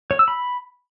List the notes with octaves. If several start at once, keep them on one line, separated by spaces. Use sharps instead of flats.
C#5
E6
B5